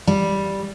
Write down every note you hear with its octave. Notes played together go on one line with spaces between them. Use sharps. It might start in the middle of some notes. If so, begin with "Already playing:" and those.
G3